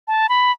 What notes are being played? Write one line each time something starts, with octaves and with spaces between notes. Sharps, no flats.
A5
B5